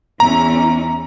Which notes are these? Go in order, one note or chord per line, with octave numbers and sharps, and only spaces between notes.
E2 C#4 E4 A#5